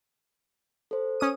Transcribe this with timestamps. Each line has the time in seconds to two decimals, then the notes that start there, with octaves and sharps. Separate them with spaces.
0.91 A4 C5
1.20 C#4 D#6 D#7